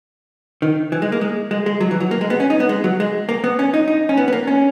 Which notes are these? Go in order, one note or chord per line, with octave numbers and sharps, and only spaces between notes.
D#3
E3
G#3
A#3
G#3
G#3
G#3
F#3
E3
F#3
A#3
G#3
B3
C#4
D#4
B3
G#3
F#3
G#3
A#3
B3
C#4
D#4
D#4
C#4
B3
B3
A#3
C#4